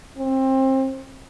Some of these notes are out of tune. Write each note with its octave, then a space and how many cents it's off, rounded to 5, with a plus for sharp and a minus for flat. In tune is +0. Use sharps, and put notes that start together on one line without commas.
C4 +25